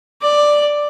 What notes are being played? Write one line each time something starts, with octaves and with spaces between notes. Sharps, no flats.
D5